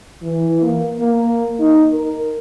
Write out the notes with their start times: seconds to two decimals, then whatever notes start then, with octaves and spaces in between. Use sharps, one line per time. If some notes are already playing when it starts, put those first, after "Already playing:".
0.22 E3
0.61 A#3
1.00 A#3
1.60 D#4
1.91 A#4